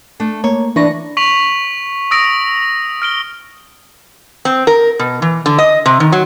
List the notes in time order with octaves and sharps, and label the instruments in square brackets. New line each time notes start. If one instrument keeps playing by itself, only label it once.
[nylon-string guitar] A3 D4
[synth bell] A#3 [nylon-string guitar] C#5
[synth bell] E3 C#6 A#6 [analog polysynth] D4 [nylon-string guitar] B4
[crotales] C#6 B6 F7 F#7
D#6 E6 A#6 D7
F6 D7 G7
[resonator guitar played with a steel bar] C4
A#4
B2
E3
D3
D#5
C3
D#3
F#3